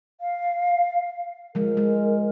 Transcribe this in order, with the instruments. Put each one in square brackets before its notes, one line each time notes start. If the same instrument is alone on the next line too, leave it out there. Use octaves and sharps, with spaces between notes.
[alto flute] F5
[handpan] F3 G#3 [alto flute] A#4
[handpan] G#3